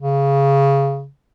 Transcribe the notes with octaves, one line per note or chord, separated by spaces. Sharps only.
C#3